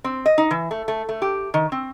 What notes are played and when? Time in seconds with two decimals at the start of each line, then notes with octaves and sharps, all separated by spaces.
0.04 C4
0.26 D#5
0.38 D#4
0.51 E3
0.71 A3
0.88 A3
1.09 A3
1.22 G4
1.54 D#3
1.72 C4